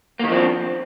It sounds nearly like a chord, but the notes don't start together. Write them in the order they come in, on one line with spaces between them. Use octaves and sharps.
A#3 D#3 F3 C4 D4